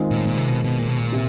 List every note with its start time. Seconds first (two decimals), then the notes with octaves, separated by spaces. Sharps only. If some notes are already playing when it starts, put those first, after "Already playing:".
Already playing: D#3 G#3 C4 F4 G#4
0.11 A#2
0.17 A2
0.27 A#2
0.37 C3
0.47 B2
0.64 B2
0.79 A#2
0.88 B2
0.98 A#2
1.12 C3